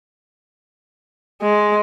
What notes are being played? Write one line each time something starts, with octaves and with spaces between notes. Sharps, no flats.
G#3